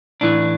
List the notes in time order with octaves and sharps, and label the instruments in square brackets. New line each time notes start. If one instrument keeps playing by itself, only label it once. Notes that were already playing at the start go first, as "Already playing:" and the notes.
[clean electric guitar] A2 E3 D4